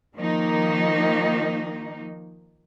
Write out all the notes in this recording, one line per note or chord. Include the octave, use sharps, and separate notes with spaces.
D#3 F3 A#3 D#4